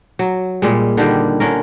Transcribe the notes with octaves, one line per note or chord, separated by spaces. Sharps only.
F#3
A#2 G3 G#3
D3 D#3 G3
D3 C#4 A#4